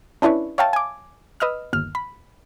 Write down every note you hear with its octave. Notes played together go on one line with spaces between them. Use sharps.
C#4 D4 E4 B4 C#5
C#5 E5 F5 G5 A5
G#5 D6
B4 D#5 E6 F6
G1 D#2 F6
B5